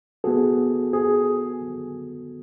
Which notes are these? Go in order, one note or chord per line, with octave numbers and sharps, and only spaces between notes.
B3 F#4 G#4 A4
G#4